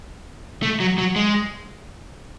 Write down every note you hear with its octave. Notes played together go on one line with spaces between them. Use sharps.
A3
F#3
F#3
G#3